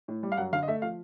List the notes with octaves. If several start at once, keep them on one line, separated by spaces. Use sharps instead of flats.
A2
G3
F5
F#2 F#5
D3 F5
D#5
A3 E5
F3 F5